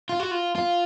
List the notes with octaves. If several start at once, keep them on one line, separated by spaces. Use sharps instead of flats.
F4
F#4
F4
F4